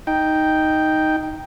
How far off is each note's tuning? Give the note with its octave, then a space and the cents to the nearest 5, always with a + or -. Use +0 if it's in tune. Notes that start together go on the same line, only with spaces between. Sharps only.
D#4 +0 G5 +0